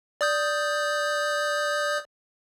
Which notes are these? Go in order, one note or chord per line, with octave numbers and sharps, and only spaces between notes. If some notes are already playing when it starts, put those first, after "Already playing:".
D5 D#6 G6